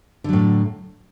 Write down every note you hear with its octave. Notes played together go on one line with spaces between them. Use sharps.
A2 D3 F#3